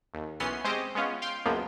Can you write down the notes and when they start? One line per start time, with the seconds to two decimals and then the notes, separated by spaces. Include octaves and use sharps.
0.14 D#2
0.40 B1 E3 B3 C#4 C6 C7
0.64 G#3 C4 C#4 G4 C5 D#5
0.95 G#3 B3 C#4 F4
1.22 F5 G5 C6
1.45 C#2 F#2 F3 G#3 A#3 B3